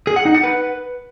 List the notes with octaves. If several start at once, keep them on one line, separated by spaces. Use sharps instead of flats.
G#4
F#5
D#4
F#5
B4